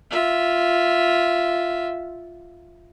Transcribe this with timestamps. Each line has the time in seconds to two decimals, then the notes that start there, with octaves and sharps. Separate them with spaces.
0.11 F4 E5